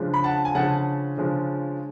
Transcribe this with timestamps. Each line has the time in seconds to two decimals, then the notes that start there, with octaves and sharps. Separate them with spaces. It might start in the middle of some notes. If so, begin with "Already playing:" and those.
Already playing: C#3 F3 G#3 D4
0.14 B5
0.24 F#5 A5
0.45 G#5
0.55 C#3 F3 G#3 D4 F#5 A5
1.18 C#3 F3 G#3 D4